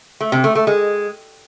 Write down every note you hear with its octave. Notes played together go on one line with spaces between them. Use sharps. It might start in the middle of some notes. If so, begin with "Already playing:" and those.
A3
C3
A3
A3
G#3